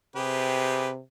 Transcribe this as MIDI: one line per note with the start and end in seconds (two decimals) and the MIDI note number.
0.16 0.99 48
0.16 0.90 67
0.16 0.90 68
0.16 0.90 71